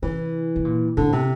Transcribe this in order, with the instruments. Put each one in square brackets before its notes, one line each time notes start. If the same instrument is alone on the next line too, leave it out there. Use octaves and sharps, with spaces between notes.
[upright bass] C3 [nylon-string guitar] E3
[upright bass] C3
A#2
[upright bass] A2 [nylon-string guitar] D3
[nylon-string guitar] C3